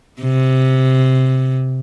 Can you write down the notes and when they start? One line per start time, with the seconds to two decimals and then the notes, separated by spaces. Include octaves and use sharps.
0.21 C3